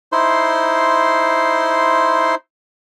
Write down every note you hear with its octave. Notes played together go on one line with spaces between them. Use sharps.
D#4 E4 C5 C6